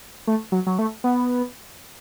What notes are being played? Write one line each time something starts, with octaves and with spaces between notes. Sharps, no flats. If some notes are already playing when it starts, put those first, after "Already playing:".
A3
F#3
F#3
A3
B3